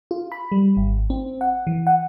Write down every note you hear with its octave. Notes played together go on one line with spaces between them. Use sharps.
F4
B5
G3
G#1
C4
F#5
E3
F#5